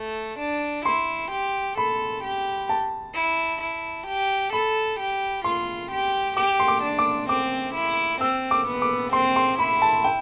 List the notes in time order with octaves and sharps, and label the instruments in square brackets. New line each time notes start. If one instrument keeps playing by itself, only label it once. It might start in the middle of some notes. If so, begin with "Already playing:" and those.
Already playing: [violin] A3
D4
[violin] E4 [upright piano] C6
[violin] G4
[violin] A4 [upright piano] B5
[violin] G4
[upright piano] A5
[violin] E4
E4
G4
[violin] A4 [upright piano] B5
[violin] G4
[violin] F4 [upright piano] C6
[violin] G4
[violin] G4 [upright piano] D6
[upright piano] C6
D6
[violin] D4
[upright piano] D6
[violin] C4 [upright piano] D6
[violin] E4
[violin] C4 [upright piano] E6
[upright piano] D6
[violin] B3
[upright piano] D6
[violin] C4 [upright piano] C6
[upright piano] C6
[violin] E4 [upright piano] B5
[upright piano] A5
G5